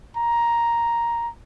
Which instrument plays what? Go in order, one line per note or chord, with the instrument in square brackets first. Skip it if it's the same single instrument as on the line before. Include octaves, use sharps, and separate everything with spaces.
[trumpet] A#5